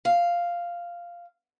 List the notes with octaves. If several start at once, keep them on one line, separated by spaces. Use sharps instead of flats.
F5